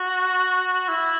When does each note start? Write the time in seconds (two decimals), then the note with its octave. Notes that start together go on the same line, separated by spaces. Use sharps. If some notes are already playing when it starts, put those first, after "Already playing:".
Already playing: F#4
0.88 E4